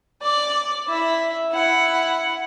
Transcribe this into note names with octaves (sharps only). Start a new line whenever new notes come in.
D5 D6
E4 E5
E4 F#5